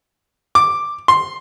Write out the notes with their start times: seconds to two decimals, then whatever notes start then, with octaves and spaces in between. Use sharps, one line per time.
0.55 D6
1.08 C6